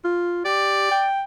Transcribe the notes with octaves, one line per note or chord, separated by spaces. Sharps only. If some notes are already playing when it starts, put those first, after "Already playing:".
F4
G4 D5
G5